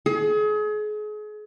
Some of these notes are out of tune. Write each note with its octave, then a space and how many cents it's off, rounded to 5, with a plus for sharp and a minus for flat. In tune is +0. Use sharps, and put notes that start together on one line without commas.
G#4 +35